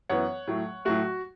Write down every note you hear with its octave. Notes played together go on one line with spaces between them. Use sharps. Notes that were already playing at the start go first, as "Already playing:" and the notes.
F#2 E3 B3 C#5 F#5
A2 F#3 A3
A2 F#3 A3 F#4